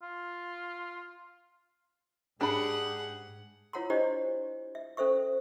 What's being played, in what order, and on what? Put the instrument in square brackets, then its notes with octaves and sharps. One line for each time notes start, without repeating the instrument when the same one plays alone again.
[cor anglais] F4
[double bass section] G#2 [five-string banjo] D4 B5 [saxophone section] G4 G#4 [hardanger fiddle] F#5
[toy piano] E4 F4 C#5 F#5 A#5 C6
D4 E4 G4 C5 D5 D#5
E5
C#4 A4 C5 E5 C#6